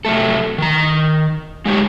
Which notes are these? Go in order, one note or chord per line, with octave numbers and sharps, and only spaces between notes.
C3 F#3 A3 A4
D#3 A#5
G#3 D#4 G4 C#5